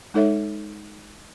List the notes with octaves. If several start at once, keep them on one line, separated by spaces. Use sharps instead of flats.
G#3 D#4 A4 C#5 E5